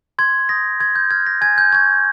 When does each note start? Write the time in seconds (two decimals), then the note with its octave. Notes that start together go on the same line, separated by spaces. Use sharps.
0.19 C6 G#6
0.49 D#6 G6 A#6
0.80 C6 G#6
0.96 G6
1.11 F6 G#6
1.26 A#6
1.41 G#5 G#6
1.58 G6
1.72 C#6 G6 G#6